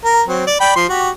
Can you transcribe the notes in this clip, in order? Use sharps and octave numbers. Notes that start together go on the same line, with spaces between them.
A#4 A#5
F#3 C4
D5
D5 G5 B5
F3 C6
F#4 G4